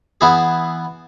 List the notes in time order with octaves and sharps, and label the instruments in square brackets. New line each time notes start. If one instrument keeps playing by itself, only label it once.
[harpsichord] E3 B3 E4 G#4